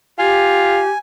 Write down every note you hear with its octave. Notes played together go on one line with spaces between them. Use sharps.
F4 G4 G#5